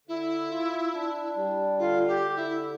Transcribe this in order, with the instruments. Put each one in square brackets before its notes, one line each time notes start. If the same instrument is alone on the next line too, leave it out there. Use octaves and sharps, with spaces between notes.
[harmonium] D3 [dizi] E4
[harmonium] F4
D4
G3
[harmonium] D3 [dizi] F4
[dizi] G4
[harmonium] D3
[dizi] E4